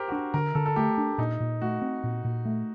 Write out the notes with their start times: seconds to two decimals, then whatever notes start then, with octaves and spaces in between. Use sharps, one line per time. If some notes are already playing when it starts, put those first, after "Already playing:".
Already playing: G4 A#4 C5
0.08 F#4
0.12 D4 G4
0.34 D3 A#4
0.55 D3 A4
0.66 A4
0.76 A3 G4
0.98 D4
1.18 A#2 D#4
1.40 A#2
1.62 A3 F#4
1.82 C4
2.04 A#2
2.25 A#2
2.45 A3